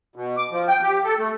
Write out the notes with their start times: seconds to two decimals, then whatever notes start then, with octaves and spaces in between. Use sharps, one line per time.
0.16 B2
0.37 D6
0.52 F3
0.68 G5
0.83 G4
1.05 A4
1.19 A3